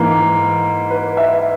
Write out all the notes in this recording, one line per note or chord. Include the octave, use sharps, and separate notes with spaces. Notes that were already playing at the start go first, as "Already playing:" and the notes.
Already playing: G#2 E3 A#3
B4
E5